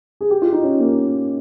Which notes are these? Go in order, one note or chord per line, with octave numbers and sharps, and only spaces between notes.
G#4
G4
F4
D#4
C#4
A#3